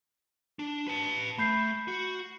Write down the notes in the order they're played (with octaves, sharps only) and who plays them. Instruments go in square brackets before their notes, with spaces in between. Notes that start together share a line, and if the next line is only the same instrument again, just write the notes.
[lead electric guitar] D4
B4 A5
[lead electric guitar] A3 [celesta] B5 G6 C7
[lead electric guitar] F#4